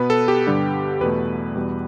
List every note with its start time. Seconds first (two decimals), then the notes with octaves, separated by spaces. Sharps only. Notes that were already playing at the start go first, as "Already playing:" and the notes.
Already playing: B2 B3 B4
0.10 A4
0.28 G4
0.47 G2 D3 G3 B3
1.01 E2 B2 A3 B4
1.55 E2 B2 G3 B3